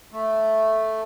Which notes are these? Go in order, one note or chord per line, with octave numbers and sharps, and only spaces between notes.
A3